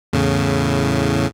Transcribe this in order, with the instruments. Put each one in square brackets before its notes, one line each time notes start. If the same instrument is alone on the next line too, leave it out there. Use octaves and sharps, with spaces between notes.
[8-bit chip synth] E2 A2 C#3